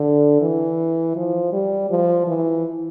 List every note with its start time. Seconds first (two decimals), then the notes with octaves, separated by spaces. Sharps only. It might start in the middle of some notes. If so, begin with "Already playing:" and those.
Already playing: D3
0.41 E3
1.16 F3
1.53 G3
1.90 F3
2.27 E3